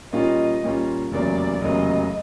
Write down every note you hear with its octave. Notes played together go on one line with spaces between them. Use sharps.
A#2 G3 A#3 C#4 F4 D#5
A#2 G3 A#3 C#4 F4
F1 E2 C#3 F#3 A#3 D5
F1 E2 C#3 F#3 A#3 D#5